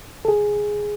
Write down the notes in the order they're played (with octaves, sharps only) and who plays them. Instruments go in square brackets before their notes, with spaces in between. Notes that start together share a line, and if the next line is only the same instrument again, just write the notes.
[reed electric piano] A4
G#4